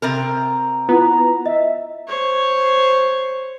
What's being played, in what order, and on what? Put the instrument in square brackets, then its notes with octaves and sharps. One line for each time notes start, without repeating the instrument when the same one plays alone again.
[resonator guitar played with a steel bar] C3 C4 A#4
[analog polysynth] B3 [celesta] E4 F4 [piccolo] A#5
[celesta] D#5 [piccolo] E5
[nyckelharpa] C5 C#5